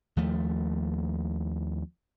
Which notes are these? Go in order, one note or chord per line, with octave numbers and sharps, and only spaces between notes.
D#2 F3 A3